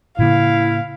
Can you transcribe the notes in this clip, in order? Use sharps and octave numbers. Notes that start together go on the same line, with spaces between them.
A2 C#3 A#3 E4 F5